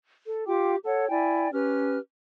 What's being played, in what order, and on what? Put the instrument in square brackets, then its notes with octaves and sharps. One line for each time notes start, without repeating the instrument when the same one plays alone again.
[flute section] A4
F4 G4 G5 D6
A4 C#5 F#5
E4 D5 G5 G#5
C#4 G4 B4 F6